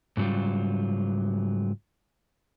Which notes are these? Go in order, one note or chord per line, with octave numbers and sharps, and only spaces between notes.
G#2 C#3 F#3 G3 F4